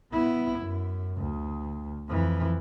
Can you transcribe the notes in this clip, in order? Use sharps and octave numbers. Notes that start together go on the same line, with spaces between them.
B3 E4
F#2
D2
F2 E3